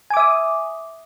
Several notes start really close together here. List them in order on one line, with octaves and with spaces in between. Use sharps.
G#5 D6 E5 D#6